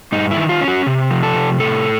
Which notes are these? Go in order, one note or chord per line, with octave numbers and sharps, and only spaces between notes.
G2 D#4
E4
D#3
F4
C#4
F#4
C3
F3
A4
C3
A2 A4